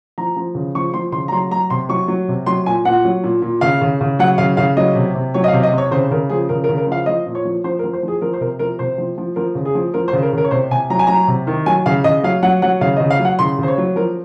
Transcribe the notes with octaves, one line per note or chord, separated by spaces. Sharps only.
F3 A#5
F3
C#3
F3 C#6
F3 C6
C#3 C6
A#5
F#3 C6
F#3 A#5
C3 C6
F#3 C#6
F#3
C3
F#3 C6
A#2 G#5
A#2 F#5
F#3
A#2
A#2
C#3 F5
C#3
C#3
F#3 F#5
C#3 F5
C#3 F5
F#3 D#5
C3
C3
F#3 C#5
D#5
F5
C3
D#5
C3
C#5
C#3 C5
C#3 A#4
F3 G#4
C#3 A#4
A#4
C#3
A#4
F3 F5
F3 D#5
A#2
C#5
F3
F3 C5
A#4
F3
C5
F3 G#4
F3 A#4
C5
C3 A#4
F3 A#4
C3 C5
F3
F3
F3 A#4
C#3
G#4
F3
F3 A#4
C5
C#3
A#4
C#3 A#4
C#5
C3 C5
C3 G#5
F#3 A#5
G#5
F#3 A#5
C3
D#3
F#3 G#5
C#3 F5
C#3 D#5
F#3 F5
F#3 F#5
F#3 F#5
C#3 F5
D#5
C#3
F5
F#3
F#5
C#3 C6
C#3 C5
C#5
F#3
F3 A#4